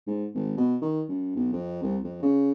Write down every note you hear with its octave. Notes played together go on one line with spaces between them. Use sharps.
G#2
G#1
B2
D#3
F#2
B1
F2
C2
F2
C#3